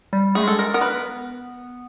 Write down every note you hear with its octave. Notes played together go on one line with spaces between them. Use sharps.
G3
A3 G#4
G#3 A4
A#4
B3 A#4
B4